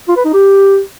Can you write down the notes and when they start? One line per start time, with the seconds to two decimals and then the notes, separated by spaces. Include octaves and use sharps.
0.08 F4
0.16 B4
0.25 D#4
0.33 G4